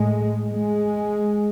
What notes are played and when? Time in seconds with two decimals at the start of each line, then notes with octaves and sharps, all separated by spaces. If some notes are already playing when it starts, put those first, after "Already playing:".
Already playing: A2 G#3
0.49 G#3